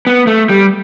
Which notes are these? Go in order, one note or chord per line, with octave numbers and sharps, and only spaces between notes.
B3
A3
G3